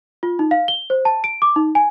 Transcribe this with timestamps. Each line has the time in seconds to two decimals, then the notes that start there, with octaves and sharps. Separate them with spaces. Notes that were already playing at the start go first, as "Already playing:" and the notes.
0.23 F4
0.39 D#4
0.51 F5
0.68 G7
0.90 C5
1.05 A5
1.24 D7
1.42 D6
1.56 D#4
1.75 G#5